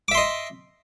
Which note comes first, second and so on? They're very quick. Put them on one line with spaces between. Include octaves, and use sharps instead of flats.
D6 E5 C6 D#5